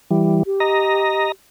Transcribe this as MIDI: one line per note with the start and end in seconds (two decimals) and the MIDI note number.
0.11 0.43 52
0.11 0.43 55
0.46 1.29 67
0.60 1.32 75
0.60 1.32 82